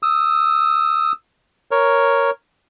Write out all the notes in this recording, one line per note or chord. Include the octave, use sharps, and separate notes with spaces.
D#6 E6
A#4 C#5